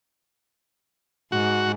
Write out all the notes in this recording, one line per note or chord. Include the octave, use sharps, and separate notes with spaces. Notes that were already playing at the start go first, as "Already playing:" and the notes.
G#2 F#4